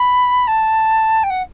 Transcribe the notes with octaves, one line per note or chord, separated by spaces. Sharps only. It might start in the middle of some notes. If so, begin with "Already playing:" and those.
Already playing: B5
A5
G5
F#5